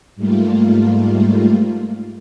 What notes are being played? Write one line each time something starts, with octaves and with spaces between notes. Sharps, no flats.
G#2 G3 A3 A#3 F4